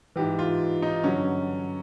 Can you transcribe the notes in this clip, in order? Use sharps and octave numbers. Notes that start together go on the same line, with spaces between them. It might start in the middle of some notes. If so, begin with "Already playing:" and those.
G#2 E3 G4
F4
D#4
G2 D3 F#3 C#4